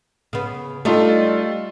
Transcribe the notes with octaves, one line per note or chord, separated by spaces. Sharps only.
C#3 B3
G3 A3 D4 D#4 F4 A4